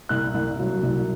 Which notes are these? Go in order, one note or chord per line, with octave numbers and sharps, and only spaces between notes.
C2 F#6
C2
F#3
C2